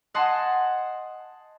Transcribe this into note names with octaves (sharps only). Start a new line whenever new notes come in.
D#5 F#5 G#5 A5 C6